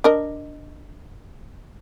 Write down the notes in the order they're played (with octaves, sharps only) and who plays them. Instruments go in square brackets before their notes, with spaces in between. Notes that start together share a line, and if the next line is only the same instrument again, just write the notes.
[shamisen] D4 A#4 D#5